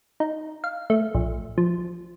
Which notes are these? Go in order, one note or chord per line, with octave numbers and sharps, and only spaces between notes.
D#4
F5
A3
A#1
F3